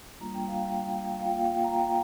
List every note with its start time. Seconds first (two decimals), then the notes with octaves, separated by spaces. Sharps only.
0.20 G3 A#3 D4 F4 A#5
0.34 G5
0.48 F5
0.62 G5
1.19 F5
1.26 F4 G5
1.30 A#3
1.39 F5
1.52 G5
1.64 A#5
1.78 G5